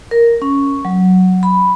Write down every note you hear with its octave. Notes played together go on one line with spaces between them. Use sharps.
A#4
C#4
F#3
B5